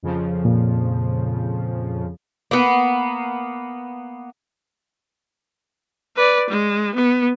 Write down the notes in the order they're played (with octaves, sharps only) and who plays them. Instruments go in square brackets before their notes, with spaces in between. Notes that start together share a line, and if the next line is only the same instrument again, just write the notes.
[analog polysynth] F2 C#3 F3
[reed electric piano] A#2
[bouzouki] A#3 B3
[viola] B4 D5
G#3
B3